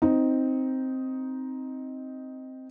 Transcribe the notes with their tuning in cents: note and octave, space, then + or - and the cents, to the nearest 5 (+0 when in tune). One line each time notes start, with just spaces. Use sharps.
C4 +0 D#4 +5